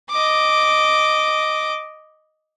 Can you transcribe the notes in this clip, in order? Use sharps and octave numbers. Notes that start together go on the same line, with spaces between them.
D#5 D6